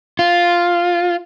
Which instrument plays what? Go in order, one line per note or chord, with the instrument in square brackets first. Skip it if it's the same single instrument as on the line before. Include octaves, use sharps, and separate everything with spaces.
[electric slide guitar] F4